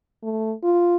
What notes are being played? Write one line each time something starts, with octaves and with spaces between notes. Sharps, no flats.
A3
F4